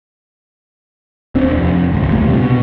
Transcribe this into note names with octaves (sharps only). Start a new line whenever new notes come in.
D#1 C4 D4
F2 C3
G#1 C#2
E2 G2 A#2 A3
D2 C3 G3
B2